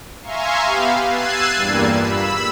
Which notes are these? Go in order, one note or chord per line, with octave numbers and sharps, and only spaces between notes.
E5 F5 G#5 A#5 C6 C#6
B3 G4 F5 B5
E6 F#6 G#6 A6 C7 D#7
E2 G2 A#2 G3 A#3
B5 E6